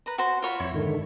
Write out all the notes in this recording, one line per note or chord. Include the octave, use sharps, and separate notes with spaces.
B4 A#5
F#4 C5
F4 C#5 B5
F2 E4 C#5
G#2 D3 D#3